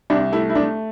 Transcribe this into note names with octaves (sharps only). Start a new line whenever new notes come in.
C2 D4
A3 E4
E4
A3 D4